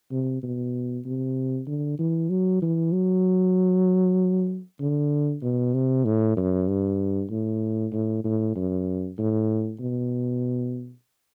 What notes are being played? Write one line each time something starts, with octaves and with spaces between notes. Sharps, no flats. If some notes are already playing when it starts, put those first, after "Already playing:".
C3
B2
C3
D3
E3
F#3
E3
F#3
D3
B2
C3
A2
F#2
G2
A2
A2
A2
F#2
A2
B2